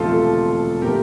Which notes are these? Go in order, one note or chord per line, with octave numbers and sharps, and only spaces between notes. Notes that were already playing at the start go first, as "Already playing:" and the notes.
Already playing: E1 D2 C3 F3 A3 F4 A4
A#2 F3 A3 G4 A#4